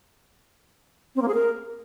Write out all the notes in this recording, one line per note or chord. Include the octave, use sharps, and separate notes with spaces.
C4
A#3
G#4
A#4